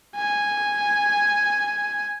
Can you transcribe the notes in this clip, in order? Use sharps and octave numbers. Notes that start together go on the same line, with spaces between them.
G#5